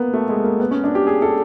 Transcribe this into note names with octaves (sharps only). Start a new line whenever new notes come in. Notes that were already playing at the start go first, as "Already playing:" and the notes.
Already playing: A#3 B3
A3
G#3
A#3
B3
C#4
D4
G4
G#4
A4